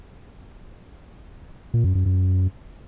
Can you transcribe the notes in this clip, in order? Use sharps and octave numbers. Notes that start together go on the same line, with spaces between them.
A#2
F#2
F#2
F#2